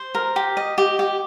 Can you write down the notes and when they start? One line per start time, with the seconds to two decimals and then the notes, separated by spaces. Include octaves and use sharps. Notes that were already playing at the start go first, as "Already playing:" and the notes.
Already playing: C5
0.15 A#4
0.36 G4
0.57 D#5
0.78 G4
0.99 G4